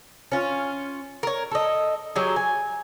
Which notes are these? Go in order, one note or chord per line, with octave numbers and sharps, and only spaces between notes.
C#4 F4
A#4 C#5
A4 D#5
F#3 G4 G#4
G#5